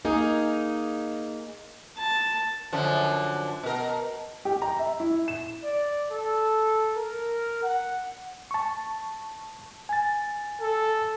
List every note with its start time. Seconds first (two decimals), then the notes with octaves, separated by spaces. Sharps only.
0.05 A#3 D#4 G#4
1.97 A5
2.73 F#2 D3 F3
3.63 B2 A#4
4.45 G4
4.62 A#5
4.79 E5
5.00 E4
5.28 E7
5.64 D5
6.12 A4
6.96 A#4
7.62 F#5
8.51 A5 C#6
9.89 G#5 A6
10.60 A4